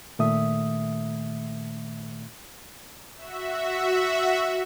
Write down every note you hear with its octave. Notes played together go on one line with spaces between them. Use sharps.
A#2 D#3 A3 E5 D#6
F#4 E5